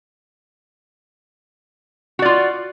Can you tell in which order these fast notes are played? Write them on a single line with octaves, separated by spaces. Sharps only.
F#4 D5 F4